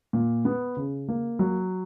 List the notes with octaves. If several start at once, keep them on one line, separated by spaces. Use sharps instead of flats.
A#2
B3
C#3
A#3
F#3